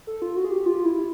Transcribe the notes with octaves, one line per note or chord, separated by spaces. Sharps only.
A4
F4
F#4
G#4
G4
F4
E4